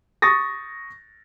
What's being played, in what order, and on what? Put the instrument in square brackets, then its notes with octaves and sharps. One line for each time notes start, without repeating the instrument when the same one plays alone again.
[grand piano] C#6 D#6 A6 A#6